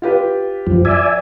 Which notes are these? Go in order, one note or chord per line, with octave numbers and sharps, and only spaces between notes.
F4 G4 B4
F#2 F3
D5 E5 G#5